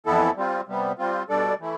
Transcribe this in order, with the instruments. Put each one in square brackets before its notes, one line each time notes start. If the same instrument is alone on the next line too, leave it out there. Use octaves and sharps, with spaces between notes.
[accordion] F2 E3 B3 E4 A4
G3 C4 F4
C3 G3 B3
G3 C4 F4
B2 G3 D4 A4 D5
E3 A3 E4